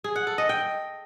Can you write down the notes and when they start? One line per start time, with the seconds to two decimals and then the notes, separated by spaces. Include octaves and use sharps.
0.04 G#4
0.16 F#5
0.27 A4
0.38 D#5
0.49 G5